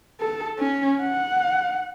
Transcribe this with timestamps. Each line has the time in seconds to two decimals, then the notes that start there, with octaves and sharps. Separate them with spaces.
0.20 A4
0.58 C#4
1.01 F#5